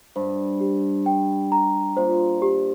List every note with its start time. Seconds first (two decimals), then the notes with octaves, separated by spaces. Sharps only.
0.16 G2 C5
0.61 G4
1.06 G5
1.52 A#5
1.97 A#2 C5
2.42 G4